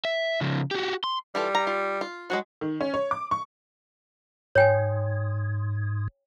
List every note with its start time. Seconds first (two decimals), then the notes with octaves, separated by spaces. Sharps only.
0.05 E5
0.41 C#3 F3
0.71 F#4 G4
1.04 C6
1.35 E3 G3 F4 A4
1.55 A#5
1.67 F4
2.01 F4
2.30 F3 F#3 G#3 F#4
2.61 D#3
2.81 C#4
2.94 C#5
3.11 D6
3.31 C#6
4.55 G#2 C#5 G5 G#5